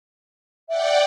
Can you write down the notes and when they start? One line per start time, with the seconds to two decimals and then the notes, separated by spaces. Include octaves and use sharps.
0.69 D5 E5 F#5 G5